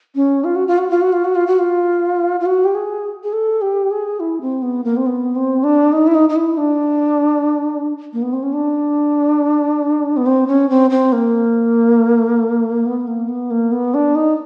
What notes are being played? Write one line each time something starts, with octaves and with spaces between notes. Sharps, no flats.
C#4
F4
F#4
F4
F#4
F4
F#4
F4
F#4
F4
F#4
F4
F4
F#4
G4
G#4
G#4
A4
G4
G#4
E4
C4
B3
A#3
C4
B3
C4
D4
D#4
E4
D#4
D#4
E4
D4
A#3
B3
C4
C#4
D4
B3
C4
C#4
C4
C4
A#3
B3
A#3
B3
A#3
B3
D4
D#4